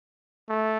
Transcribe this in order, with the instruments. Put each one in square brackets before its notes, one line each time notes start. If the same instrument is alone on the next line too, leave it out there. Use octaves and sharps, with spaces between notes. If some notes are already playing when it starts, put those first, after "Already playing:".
[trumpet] A3